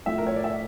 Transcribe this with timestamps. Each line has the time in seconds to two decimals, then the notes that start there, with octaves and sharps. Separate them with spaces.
0.06 A2 F3 A3 E5
0.18 A#4
0.27 C#5
0.36 D5
0.44 E5